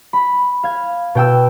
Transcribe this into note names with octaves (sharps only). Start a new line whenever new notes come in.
B5
F5 G#6
B2 G5 E6